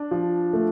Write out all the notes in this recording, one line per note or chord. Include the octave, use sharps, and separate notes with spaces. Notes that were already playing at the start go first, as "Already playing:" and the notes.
Already playing: D4
F3
A3